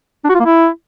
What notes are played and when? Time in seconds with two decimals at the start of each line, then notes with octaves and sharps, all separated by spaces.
0.25 D4
0.30 F#4
0.35 F4
0.40 A#3
0.45 E4